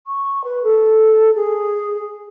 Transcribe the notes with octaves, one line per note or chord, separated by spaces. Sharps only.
C#6
B4
A4
G#4